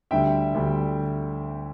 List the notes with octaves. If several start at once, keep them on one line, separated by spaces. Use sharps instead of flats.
D2 D3 G3 E5 G5
D2 D3 G3